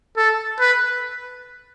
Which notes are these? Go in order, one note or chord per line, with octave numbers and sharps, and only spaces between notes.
A4
B4